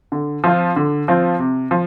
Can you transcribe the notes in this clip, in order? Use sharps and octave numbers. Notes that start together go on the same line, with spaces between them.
D3
F3 C4 F4
D3
F3 C4 F4
C3
F3